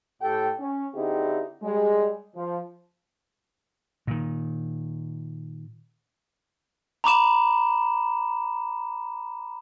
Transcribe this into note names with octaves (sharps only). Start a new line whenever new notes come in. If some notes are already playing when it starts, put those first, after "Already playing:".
A2 G4 A4 G5
C#4
D3 C4 D#4 E4 G4 G#4
G3 G#3
F3
A#2 D#3
A#5 B5 D6 E7